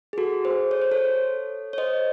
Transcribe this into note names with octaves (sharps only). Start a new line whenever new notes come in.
G#4
F#4 A4
G#4 C5
C#5
C5
A4 C#5
C#5
C5 D#5